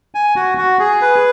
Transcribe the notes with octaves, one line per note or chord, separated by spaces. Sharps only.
G#5
F#4
F#4
G#4
B4